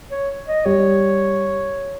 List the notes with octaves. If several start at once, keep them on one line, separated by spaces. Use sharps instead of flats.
C#5
D#5
G3 C#5